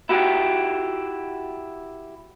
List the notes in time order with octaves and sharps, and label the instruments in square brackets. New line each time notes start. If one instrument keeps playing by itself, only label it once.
[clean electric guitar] E4 F#4 G4